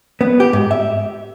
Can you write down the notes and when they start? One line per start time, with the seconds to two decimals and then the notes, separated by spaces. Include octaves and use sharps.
0.21 B3
0.40 G4
0.53 G#2
0.71 E5